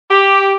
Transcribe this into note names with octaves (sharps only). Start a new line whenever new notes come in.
G4